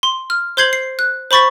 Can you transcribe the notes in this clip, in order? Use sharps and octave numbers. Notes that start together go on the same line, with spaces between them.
C6
F6
C5 C6 G6 G#6 C7 F#7
C7
F#6
C5 B5 C#6 A6 B6